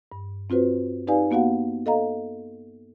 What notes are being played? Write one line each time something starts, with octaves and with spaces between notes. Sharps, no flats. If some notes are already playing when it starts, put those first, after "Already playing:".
G2
C4 F4 F#4 B4 C5
D#4 G4 B4 D5 F5 G#5
A#3 B3 F#4 F5 F#5
A4 D#5 F5 A#5